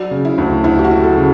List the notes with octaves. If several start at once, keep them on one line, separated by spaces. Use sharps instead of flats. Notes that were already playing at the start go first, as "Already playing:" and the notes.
Already playing: F#3 D5
C#3
E4
D2
D2 E4
G4
F#4
F#3
A4
C#3